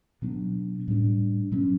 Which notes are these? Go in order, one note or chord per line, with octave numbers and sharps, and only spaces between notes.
B2 F#3 B3 D4
A2 G3 B3 D4
B2 F#3 C#4